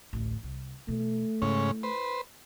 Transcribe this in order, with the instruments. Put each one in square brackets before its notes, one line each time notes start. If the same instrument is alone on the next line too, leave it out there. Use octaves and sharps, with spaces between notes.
[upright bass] A1 D2
C2
[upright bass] B2 E3 [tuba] A3
[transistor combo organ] G#2 C#3 C#4 [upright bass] E4
[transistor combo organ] B4 C5